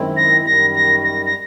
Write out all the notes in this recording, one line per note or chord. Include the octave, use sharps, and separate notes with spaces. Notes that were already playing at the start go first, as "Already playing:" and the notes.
Already playing: F#2 D#3 G#3 C4 E4
A#6
F#2 D#3 G3 A#6
A#6
A#6
A#6